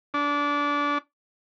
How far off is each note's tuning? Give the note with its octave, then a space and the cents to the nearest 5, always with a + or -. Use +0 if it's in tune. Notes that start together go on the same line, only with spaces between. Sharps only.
D4 -20